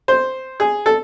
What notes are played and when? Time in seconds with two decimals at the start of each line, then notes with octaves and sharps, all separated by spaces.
0.08 C5
0.60 G#4
0.86 A4